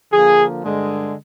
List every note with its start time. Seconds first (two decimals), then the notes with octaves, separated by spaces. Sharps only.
0.12 D3 F3 A#3 G#4
0.64 G2 D3 G#3